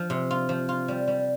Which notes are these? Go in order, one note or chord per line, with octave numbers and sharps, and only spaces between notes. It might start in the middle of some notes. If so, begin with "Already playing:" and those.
Already playing: F3
C3
F4
F3
F4
G3
G3